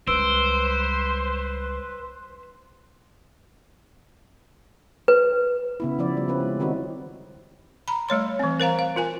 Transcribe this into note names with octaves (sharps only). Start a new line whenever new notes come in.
C#2 G3 B4 C5 E6 D7
B4
C#3 B3 E4
F3 E4 D5
G3
C4 C#4 B4
G#3
D#3 C4 D#4 E4 F#4
A#5 B5
G3 A3 C#5 C6
E3 C4
A#4 C5 F5 A#5
F5
F4 A#4 G#5